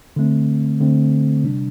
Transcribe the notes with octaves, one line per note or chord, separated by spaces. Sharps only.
D3 A3 C4
D3 A3 C4
C3 G3 D4